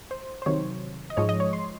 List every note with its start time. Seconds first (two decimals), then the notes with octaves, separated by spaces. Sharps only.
0.11 C5
0.42 C5
0.46 C3 D#3 F#3 C#5
1.10 D#5
1.17 G#2 F3 G#3 C#5
1.29 D#5
1.40 C#5
1.53 C6